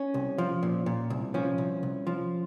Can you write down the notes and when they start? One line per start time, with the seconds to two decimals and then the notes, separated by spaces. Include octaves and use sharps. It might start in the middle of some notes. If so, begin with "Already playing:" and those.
Already playing: C#4
0.14 C2
0.38 F3
0.63 A#2
0.86 A#2
1.10 C2
1.34 F3 C#4
1.58 C2
1.83 C2
2.07 F3